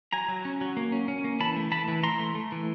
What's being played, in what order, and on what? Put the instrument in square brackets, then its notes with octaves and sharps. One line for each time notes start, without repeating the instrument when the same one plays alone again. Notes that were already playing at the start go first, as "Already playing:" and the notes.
[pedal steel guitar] F#3 G#5 A#5
F#3
C#4
F#3
A#3
C#4
C#4
A#3
E3 A5 B5
A3
E3 A5 B5
E3
E3 A#5 C6
A3
A3
E3